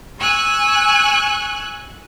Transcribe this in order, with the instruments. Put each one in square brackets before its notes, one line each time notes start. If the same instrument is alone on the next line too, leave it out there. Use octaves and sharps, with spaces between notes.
[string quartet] G#5 C#6 E6 F#6 G#6